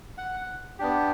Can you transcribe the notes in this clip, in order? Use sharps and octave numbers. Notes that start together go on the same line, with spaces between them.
F#5
B3 D4 G4